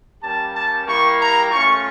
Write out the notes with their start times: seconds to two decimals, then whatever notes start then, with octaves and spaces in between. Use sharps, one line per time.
0.22 G3 A#3 C#4 G4 A5
0.54 A5
0.86 G3 A#3 E4 G4 C#6
1.18 A#5
1.50 A3 C#4 F4 C#6